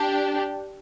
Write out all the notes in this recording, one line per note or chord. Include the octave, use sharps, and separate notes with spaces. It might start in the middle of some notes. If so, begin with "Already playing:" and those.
Already playing: D4 G4